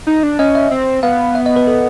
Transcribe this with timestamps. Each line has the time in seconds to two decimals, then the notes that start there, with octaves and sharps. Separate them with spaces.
0.07 D#4
0.23 D4
0.39 C#4 D#5
0.55 E5
0.71 C4
1.03 B3 F5
1.35 E5
1.46 D#5
1.56 B4
1.67 A4